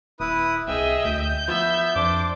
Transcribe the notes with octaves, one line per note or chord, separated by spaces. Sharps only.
D#1 E4 B4 D#6
C2 G#4 D#5 E5 G5
D2 G6
F3 B3 E5
F2 D4 C5 D6